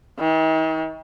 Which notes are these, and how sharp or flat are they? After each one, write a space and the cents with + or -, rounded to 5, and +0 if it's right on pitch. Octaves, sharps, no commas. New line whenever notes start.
D#3 +45